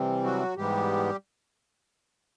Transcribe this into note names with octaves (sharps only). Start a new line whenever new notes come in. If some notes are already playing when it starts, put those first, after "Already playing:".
Already playing: C3 E3 G3 C4
F#3 F#4
G#2 E3 G3 G#3 B3 G4